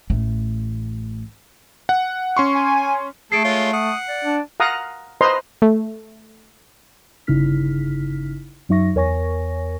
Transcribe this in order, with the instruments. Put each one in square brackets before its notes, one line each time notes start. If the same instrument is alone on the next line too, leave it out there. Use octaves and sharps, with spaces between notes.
[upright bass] A1 A3
[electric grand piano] F#5
C#4 C6 C#6
[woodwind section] G#5
[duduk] A3 [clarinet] G#4 [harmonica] A4 [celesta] C7 D7
[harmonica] G#3 F4 [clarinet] C#5
[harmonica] F#5 [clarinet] D#6
[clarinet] D5
[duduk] D4
[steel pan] F5 F#5 A#5 D#6
B4 C5 D#5 A#5 C6
[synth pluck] A3
[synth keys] G1 C#3 D#4 E4 F6 B6
F#2 F#3 D#4 E5 C#6 A#6
E2 A#4 C#5 G#5 C#6 A#6